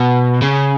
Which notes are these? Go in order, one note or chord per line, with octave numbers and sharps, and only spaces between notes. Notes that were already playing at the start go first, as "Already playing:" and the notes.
Already playing: B2
C#3